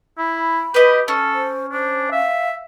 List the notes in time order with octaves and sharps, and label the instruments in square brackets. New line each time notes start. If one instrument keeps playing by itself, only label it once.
[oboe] E4 [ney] B5
[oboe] G4 [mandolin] B4 D#5
[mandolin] C#4 [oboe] A4
[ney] C5
[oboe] D4 [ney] C5
[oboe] E5 [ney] F5